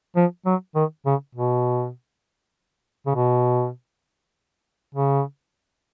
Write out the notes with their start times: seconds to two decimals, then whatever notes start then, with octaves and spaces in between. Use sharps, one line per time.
0.16 F3
0.46 F#3
0.75 D#3
1.06 C#3
1.35 B2
3.06 C#3
3.15 B2
4.95 C#3